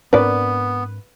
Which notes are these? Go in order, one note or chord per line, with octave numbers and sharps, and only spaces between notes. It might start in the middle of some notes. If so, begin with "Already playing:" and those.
G#2 B3 C4 D4 A#4 B4 D5